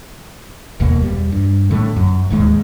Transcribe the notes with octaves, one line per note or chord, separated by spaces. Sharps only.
F1 D#2 B2 A#3
E2 G3
G2
A2 D3 A3
F#2
D1 D#2 G#2 G#3